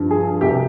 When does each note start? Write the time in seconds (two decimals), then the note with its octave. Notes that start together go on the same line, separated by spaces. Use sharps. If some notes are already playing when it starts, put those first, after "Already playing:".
Already playing: G2 F3
0.11 G#4
0.41 C2 B2 G4